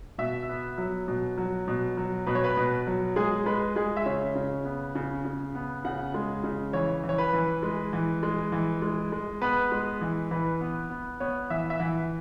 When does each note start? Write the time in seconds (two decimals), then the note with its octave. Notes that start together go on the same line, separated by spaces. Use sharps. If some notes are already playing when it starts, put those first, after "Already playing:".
0.18 B2 E5
0.49 B3
0.78 F#3
1.08 B2
1.38 F#3
1.68 B2
1.97 F#3
2.27 B2 B4
2.35 C#5
2.44 B4
2.57 B2
2.87 F#3
3.16 G#3 G#4
3.46 G#3 B4
3.76 G#3 G#4
3.97 E5
4.06 C#3 C#5
4.35 C#3
4.65 B3
4.95 C#3
5.25 C#3
5.55 B3
5.85 C#3 F#5
6.14 G#3
6.44 C#3
6.73 E3 C#5
7.04 E3
7.09 C#5
7.18 B4
7.33 E3
7.63 G#3
7.93 E3
8.23 G#3
8.52 E3
8.82 G#3
9.12 G#3
9.42 B3 B4
9.72 G#3
10.01 E3
10.31 E3 B4
10.61 B3
10.90 B3
11.20 B3 C#5
11.50 E3 E5
11.70 E5
11.80 E3 F#5